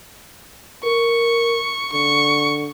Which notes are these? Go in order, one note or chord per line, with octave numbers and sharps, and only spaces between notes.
A#4 C#6
D3 C#6